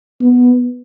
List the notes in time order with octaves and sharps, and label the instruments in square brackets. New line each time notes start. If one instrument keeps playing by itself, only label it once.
[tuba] B3